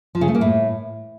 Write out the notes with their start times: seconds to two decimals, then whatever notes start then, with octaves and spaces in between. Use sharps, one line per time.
0.15 F3
0.21 C#3
0.28 A3
0.35 A#3
0.41 A2